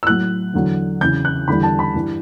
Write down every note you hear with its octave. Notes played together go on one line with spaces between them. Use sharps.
E6
A2 F#3 F#6
E2 D3 F#3
E2 C#3 E3 G6
F#6
E2 D3 G3 B5
A5
B5
G2 E3 G3